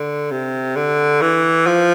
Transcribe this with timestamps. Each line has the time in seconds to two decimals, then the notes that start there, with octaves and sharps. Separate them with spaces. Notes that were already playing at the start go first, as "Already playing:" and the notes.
Already playing: D3
0.31 C3
0.76 D3
1.21 E3
1.67 F3